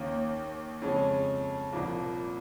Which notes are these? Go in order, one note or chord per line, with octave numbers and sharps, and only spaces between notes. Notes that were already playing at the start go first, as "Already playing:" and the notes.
Already playing: D#2 D#3 A#3 C#4
F2 C#3 G#3 C#4
C2 A#2 F3 A#3